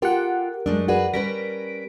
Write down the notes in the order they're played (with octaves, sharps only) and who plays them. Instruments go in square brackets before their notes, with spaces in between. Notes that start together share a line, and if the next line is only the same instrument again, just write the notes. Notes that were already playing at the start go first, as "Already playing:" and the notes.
[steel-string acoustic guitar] F4 A4 G5 [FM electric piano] G4 F#5 [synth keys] A#4
[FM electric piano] F#2 [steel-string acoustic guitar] G#3 A3 D4
[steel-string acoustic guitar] F#4 G#4 B4 [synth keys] A#4 D5 F#5
[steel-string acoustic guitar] G3 C#4 B4 [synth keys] A#4 B6 D7 [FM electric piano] A#6